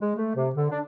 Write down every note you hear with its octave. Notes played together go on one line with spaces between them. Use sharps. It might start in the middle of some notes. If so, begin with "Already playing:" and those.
G#3
A3
C3
D3
D4